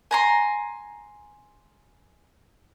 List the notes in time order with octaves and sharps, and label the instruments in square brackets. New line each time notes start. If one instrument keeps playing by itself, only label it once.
[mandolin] G#5 A#5 C6